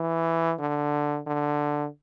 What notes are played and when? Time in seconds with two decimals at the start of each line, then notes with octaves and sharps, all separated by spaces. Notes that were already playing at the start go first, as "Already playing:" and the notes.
Already playing: E3
0.60 D3
1.27 D3